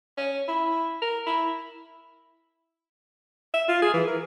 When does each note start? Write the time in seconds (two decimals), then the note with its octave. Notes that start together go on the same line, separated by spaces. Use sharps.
0.17 C#4
0.48 E4
1.02 A#4
1.26 E4
3.54 E5
3.69 F4
3.82 G#4
3.94 E3
4.07 A#4